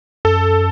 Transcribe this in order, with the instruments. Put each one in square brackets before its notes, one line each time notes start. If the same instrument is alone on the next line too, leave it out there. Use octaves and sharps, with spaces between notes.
[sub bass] F#2 [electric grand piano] A4